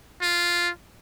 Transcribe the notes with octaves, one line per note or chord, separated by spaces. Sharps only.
F4